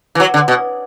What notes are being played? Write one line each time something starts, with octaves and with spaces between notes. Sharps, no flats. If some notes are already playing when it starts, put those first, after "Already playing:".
E3
F#3
D3
B2